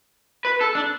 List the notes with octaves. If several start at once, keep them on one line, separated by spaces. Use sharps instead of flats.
B4
A4
D4